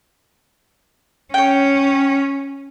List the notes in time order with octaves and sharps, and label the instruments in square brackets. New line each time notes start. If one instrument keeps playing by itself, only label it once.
[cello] C#4 [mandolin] C#5 G5